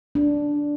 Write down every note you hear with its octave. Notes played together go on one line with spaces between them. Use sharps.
D4